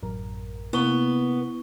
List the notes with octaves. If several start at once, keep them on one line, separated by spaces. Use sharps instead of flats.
A1 F#2 A#4
C3 A#3 B3 E4 C#6 G7